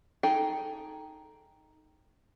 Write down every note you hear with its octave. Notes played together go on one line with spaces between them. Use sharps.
D#4 G#4 A4 G5